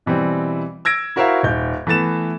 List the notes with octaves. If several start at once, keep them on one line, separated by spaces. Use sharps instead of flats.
B2 E3 G3 C4
E6 G#6 A#6 D7
E4 F#4 A#4 C5 E5 F5
D#1 G6
E3 A3 B3 A6 E7